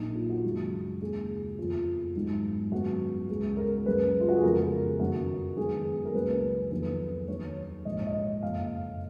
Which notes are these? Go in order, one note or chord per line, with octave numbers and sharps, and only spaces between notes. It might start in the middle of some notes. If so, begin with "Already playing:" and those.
Already playing: A#1 A#2 F#3 A#3 D#4
F4
F#4
F#1 F#2 D#3 G#3
D#2 C#3 G#3 G#4
F2 F3 B3 F4
G#1 G#2 F#3 B3 D#4
F#2 D#3 G#3 B3 F#4
C#2 C#3 G#3 B3
A#4
F#1 F#2 C#3 G#3 B4
F4
F#4
G#4
F2 C#3 G#3 B3 A#4
F#2 D#3 F#3 F#4
F#2 D#3 G#3 B3 G#4
A#4
C#2 C#3 F#3 A#3 B4
F2 D#3 F#3 B3 B4
D#2 D#3 F#3 A#3 C#5
A#1 G#2 F3 D#5
C#5
D#5
F#1 F2 F3 A#3 F5